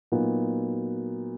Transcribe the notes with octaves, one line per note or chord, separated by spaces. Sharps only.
A#2 F#3 B3 D#4 F#4